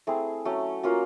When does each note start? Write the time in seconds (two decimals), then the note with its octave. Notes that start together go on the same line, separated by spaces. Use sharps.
0.07 A3 C4 E4 G#4
0.45 F#3 A3 C#4
0.83 F#3 A#3 C#4 F4